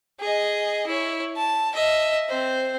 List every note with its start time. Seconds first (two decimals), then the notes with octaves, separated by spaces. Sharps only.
0.20 G#4 D#5
0.87 E4 C#5
1.36 A5
1.74 D#5 E5
2.29 C4 C5